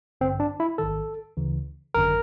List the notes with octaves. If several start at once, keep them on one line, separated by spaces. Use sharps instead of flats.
A1 G2 D3 C4
D4
E4
A1 G#2 D#3 A4
D2 C#3 E3
G#1 F#2 D3 A#4